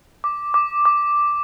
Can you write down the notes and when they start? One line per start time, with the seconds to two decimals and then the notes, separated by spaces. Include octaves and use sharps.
0.24 D6
0.54 D6
0.85 D6